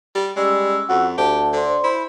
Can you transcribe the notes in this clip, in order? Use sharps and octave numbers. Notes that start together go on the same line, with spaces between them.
G3
G3 G#3 C#4 E6
F2 F#4
D2 G4 A5
D3 C5 D5 C6
E4 C5 B5